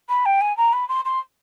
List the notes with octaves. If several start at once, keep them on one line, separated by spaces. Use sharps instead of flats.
B5
G5
G#5
A#5
B5
C6
C6